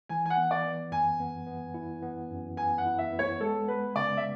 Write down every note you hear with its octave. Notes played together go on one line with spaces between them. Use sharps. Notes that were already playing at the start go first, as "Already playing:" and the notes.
E3 G#5
G#5
F#5
B3
D5
B3
F#2 G#5
B3
B3
E4
B3
F#2
B3 G#5
F#5
E4
E5
B3
C#5
G#3 A4
B3 B4
C#3 D5
E5